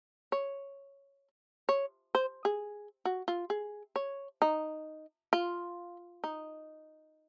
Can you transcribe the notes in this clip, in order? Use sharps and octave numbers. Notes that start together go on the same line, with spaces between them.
C#5
C#5
C5
G#4
F#4
F4
G#4
C#5
D#4
F4
D#4